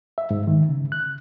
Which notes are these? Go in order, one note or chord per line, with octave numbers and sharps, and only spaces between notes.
E5
G#2
D#3
C#3
F#6